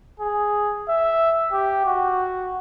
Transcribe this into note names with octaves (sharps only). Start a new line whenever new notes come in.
G#4
E5
G4
F#4